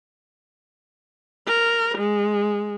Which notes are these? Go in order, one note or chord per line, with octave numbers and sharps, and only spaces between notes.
A#4
G#3